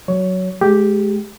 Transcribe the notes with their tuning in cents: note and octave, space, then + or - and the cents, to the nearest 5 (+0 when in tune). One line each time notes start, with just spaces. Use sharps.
F#3 +0 C#5 +15
G#3 +30 G4 +0